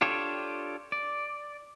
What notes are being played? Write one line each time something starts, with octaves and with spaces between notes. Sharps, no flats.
D4 F4 G4 A4 C#5
D5